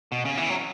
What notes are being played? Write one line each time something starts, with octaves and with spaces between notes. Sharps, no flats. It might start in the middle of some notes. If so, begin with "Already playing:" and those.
B2
C#3
E3
F#3